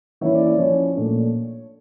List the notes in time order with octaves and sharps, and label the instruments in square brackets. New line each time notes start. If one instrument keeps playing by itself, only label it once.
[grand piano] E3 A#3 C#4 E4 C#5 E5
D5
D5
F3 C#4 E4 C#5
A#2 A3 D4